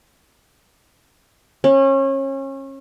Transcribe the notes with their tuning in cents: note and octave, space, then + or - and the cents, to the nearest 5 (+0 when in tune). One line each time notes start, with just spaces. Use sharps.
C#4 -30